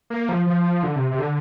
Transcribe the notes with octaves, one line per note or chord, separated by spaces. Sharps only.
A#3
F3
F3
D3
C3
C3
D3